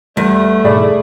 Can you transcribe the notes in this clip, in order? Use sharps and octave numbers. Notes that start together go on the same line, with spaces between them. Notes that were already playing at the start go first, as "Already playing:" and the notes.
E2 G3 A3
G#2 B2 G#4 D5 B5